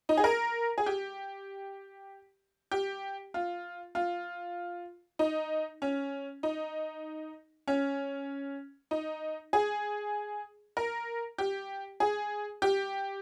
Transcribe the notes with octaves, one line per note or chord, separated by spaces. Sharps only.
D#4
G#4
A#4
G#4
G4
G4
F4
F4
D#4
C#4
D#4
C#4
D#4
G#4
A#4
G4
G#4
G4